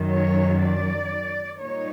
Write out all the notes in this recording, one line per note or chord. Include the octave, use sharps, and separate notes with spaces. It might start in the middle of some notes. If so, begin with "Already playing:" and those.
Already playing: F#2 D#3 F#3
C#5
D5
A#2 G3 A#3 D#4 C#5